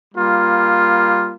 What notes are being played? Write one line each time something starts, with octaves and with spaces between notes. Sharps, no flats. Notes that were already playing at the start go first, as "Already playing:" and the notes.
G3 A#3 F4